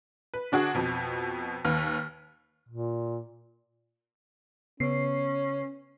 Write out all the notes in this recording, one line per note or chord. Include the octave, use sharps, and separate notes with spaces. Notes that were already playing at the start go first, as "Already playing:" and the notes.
B4
D3 D4 F#4 G#4
F2 B2
D#2 B4 F6
A#2
C#3 B3 C#4 C7